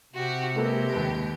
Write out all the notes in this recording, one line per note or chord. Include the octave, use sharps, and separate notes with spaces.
C3 F#4 G4
G#3 A#3 G4 A4 B4
D#2 B4